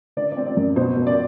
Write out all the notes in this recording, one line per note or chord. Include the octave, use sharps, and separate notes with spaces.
D3 D5
C4 D5
D5
F#2
B2 C5
B2
D5